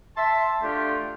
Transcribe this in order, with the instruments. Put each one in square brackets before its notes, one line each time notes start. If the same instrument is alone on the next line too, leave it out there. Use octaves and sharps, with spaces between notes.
[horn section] E5 A5 C6
A3 D4 F4 G4